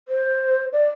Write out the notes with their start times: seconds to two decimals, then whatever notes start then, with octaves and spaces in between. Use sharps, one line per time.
0.08 C5
0.72 D5